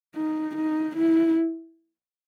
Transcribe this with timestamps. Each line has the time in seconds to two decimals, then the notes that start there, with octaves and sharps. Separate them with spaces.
0.15 D#4
0.56 D#4
0.96 E4